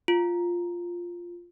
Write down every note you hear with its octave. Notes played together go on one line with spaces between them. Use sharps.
F4